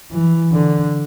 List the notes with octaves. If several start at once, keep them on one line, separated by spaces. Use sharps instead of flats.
E3
D3